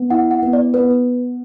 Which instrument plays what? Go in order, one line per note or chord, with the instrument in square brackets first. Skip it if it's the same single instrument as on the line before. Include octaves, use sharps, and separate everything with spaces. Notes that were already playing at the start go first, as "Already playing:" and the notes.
Already playing: [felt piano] B3
[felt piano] E4 [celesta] F#5
[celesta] F#5
[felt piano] B3
[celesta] D5
[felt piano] B3 [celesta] B4